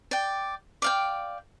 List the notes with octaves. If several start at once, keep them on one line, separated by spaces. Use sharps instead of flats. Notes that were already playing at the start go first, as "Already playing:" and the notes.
D5 G5
D5 F5 G5